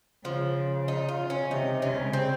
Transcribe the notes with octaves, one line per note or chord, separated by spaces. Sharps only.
C#3 F3
D#4
F4
C#4
C3 D#4
C#3 C#4
C4